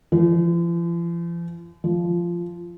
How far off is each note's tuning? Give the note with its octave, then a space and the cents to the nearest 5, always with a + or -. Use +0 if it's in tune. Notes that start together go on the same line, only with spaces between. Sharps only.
F3 -45
F3 -10